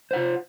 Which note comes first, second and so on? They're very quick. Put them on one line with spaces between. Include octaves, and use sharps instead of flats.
C5 F#5 F4